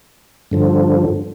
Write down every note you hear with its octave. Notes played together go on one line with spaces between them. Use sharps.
G2 D3 F3